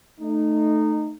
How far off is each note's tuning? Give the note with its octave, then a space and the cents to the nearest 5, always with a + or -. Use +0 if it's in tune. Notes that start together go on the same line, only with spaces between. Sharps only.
A3 +0 D#4 -20